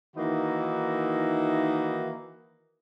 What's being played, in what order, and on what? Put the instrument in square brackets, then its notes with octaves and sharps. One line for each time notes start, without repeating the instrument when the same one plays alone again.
[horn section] D#3 E3 A#3 D#4 E4 F#4